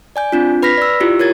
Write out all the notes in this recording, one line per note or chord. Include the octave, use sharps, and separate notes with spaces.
D5 G#5 G6
C4 D4 F4
B4 B5 F6 A#6 B6
D5 E6
E4 F4 G4
A#4 C#5 G#6 A6